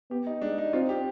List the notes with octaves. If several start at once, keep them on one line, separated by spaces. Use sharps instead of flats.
B3 G4
D#4
G#3 D4
D#4
C4 F4
G4